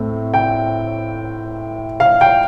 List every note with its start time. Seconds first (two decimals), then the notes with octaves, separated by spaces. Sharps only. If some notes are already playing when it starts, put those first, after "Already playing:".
Already playing: A2 A3 C4
0.34 G5
2.00 F5
2.21 G5